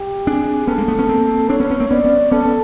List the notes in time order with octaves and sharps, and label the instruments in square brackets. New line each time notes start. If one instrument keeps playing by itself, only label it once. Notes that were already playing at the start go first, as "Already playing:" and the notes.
Already playing: [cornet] G4
[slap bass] C4 D4 [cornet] G#4
[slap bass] B3 C#4 [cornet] A4
[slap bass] G#3 A#3
A3 B3
B3 C#4
A#3 C4
[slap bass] C4 D4 [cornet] C#5
[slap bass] B3 C#4
B3 C#4
A#3 C4
[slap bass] B3 C#4 [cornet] D5
[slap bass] B3 C#4
[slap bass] B3 C#4 [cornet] A4
[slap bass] B3